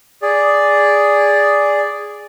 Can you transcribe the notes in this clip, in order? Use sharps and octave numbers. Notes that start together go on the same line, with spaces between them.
G#4 D5